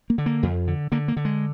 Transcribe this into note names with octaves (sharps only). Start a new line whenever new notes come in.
A#3
D3
A#3
F2
D3
D3 A#3
A#3
D3
G#3